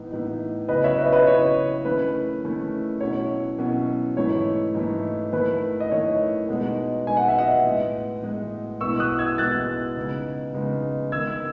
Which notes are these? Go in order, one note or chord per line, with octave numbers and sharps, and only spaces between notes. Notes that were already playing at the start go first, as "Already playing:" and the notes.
Already playing: A2 E3 B3 D#4
A2 E3 B3 D#4
C#3 F#3 B3 E4 B4 D#5
C#5 E5
B4 D#5
B4 D#5
C#3 F#3 B3 E4 C#5
D#3 A3 C#4 E4 B4
D#3 A3 C#4 E4
B2 F#3 C#4 E4 C#5
B2 F#3 C#4 E4
G#2 E3 A3 E4 C#5
G#2 E3 A3 E4
D#3 A3 E4 B4
D#5
D#3 A3 E4 C#5
B2 G#3 B3 D#4
B2 G#3 B3 D#4 G#5
F#5
E5
D#5 F#5
A2 G#3 B3
A2 G#3 B3
B2 G#3 B3 E4 C#6 E6
D#6 F#6
E6 G#6
B2 G#3 B3 E4 F#6 A6
C#3 G#3 B3 D#4
C#3 G#3 B3 D#4
D#3 G#3 B3 E6 G#6